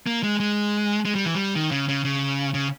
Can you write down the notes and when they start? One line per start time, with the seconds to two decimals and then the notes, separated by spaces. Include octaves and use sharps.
0.07 A#3
0.23 G#3
0.40 G#3
1.06 G#3
1.15 G3
1.25 E3
1.35 G3
1.56 D#3
1.71 C#3
1.89 C#3
2.05 C#3
2.54 C#3